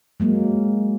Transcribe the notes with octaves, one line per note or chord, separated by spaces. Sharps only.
F#3 G#3 A#3